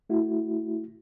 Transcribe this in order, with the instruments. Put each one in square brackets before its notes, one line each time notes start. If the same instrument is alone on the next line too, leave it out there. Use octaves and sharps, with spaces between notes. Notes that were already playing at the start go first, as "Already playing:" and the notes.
[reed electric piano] A3 E4 F#4